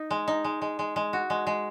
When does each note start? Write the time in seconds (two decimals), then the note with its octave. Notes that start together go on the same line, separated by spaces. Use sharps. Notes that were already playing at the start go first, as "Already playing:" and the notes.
Already playing: D#4
0.11 G#3
0.28 D#4
0.44 G#3
0.62 G#3
0.79 G#3
0.96 G#3
1.13 F#4
1.30 G#3
1.47 G#3